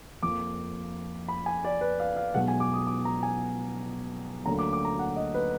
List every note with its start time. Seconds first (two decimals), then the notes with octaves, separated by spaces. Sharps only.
0.23 F2 F3 A#3 D6
1.28 B5
1.46 G#5
1.64 D5
1.81 B4
2.00 F5
2.17 F5
2.34 B1 B2 G#3 B3 F#5
2.48 G#5
2.60 D6
2.73 D#6
2.87 D6
3.05 A#5
3.23 G#5
4.45 D2 D3 F#3 A#3 A#5
4.59 D6
4.73 D6
4.85 A#5
4.99 F#5
5.16 D#5
5.34 B4